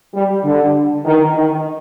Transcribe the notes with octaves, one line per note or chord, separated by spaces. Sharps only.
G3
D3
D#3
D#3